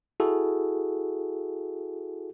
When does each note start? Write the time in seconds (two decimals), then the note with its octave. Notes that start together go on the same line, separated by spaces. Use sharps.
0.20 E4 F#4 G#4 A4